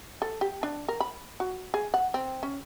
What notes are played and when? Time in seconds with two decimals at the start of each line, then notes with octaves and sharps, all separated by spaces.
0.22 A4
0.41 G4
0.63 D4
0.88 A#4
1.00 B5
1.40 F#4
1.74 G#4
1.94 F#5
2.14 C4
2.43 C#4